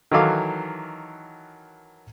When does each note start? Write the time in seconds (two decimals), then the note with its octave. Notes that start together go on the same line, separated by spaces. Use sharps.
0.12 D#3 E3 F#3 A4 F5 D6